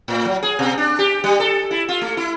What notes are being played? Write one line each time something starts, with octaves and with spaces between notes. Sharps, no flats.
A2
F#3
G#4
B2
D4
G4
G3
A4
E4
F4
A3
E4